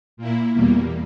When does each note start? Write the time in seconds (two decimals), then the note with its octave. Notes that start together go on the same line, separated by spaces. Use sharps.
0.17 A#2 A#3 E4
0.54 E2 B2 G3 A#3